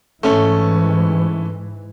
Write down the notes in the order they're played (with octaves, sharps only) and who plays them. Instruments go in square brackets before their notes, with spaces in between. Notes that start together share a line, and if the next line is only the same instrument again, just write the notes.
[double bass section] G#2 E3 [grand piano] A3 C#4